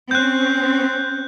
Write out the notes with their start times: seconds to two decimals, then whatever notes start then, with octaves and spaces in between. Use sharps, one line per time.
0.11 C4 C#4 F#6 G6